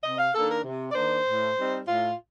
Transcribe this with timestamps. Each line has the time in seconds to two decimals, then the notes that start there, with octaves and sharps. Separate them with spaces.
0.04 C3 D#5
0.19 F5
0.35 D#3 A#3 D4 A4
0.50 A#4
0.64 C3
0.91 D5
0.95 D#3 A#3 D4 C5
1.26 A2
1.57 G3 C4 D#4
1.87 A2 F4